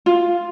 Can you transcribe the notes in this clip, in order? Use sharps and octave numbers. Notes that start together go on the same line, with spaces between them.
F4